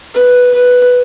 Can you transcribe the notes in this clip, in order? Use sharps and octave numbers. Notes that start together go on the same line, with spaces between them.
B4
B4